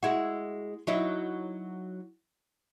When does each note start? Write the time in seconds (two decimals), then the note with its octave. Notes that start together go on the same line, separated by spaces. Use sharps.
0.03 G#3 E4 F#4
0.87 F#3 D#4 E4